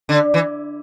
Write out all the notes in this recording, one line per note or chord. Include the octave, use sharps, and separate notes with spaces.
D3
E3